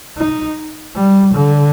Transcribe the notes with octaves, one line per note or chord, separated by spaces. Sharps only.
D#4
G3
D3